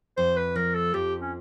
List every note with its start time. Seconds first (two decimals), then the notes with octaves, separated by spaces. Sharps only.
0.17 F2 C5
0.36 B4
0.56 F3 A#4
0.75 A4
0.94 F2 G4
1.21 C#4